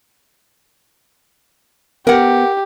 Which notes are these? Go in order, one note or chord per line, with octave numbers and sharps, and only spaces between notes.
B3 G4 A#4 F#5